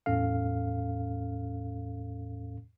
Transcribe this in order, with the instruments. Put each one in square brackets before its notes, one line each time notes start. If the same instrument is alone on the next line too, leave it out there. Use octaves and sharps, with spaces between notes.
[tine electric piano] E2 A2 C#4 A4 F5